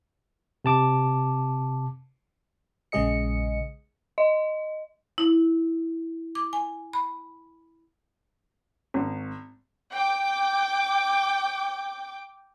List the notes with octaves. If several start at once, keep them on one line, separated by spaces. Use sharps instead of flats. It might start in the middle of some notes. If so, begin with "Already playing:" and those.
C3 A5 D6
A#1 C#3 G#3 G#4 D#5 C#7
D#5
E4
D6
G#5
B5
G#1
G5 D6